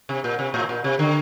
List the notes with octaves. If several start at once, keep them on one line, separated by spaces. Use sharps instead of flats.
C3
A#2
C3
A2
A#2
C3
D3